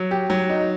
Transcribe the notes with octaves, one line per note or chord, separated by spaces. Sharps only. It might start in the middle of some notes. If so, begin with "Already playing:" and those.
Already playing: F#3
G4
F#3
D#4